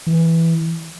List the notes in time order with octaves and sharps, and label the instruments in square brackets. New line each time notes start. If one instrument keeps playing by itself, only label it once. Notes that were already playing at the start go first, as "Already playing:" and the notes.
[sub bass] E3